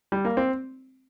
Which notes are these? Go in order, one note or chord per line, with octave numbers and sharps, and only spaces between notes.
G3
A#3
C4